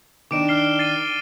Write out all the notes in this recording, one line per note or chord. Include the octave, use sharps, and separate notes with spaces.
D#3 D4 D6 D7 E7
F6 C7 G7
A6 C7 D#7